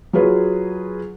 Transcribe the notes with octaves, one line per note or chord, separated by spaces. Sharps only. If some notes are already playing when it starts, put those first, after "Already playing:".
F#3 F4 F#4 G#4 B4